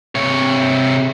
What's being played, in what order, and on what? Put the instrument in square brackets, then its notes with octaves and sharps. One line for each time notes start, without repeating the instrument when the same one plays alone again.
[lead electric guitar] C3 C#5